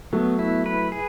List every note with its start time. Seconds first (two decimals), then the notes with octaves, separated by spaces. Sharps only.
0.13 F#3 A3 B3
0.39 E4
0.66 B4
0.92 G#4